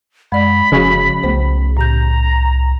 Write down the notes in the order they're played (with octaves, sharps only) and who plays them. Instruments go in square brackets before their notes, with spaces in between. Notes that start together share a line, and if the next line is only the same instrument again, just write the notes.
[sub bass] F#2 [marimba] G#3 D5 [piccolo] B5
[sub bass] F1 [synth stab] C#3 [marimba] F3 F#4
[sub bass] C2 [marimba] A3 B3 C5
[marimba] A2 G6 [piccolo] A#5